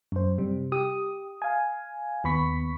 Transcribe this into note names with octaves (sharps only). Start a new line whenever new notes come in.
F#2 C5
C3 G3
G4 D#6
F5 G#5
D#2 B3 B5 C#6 B6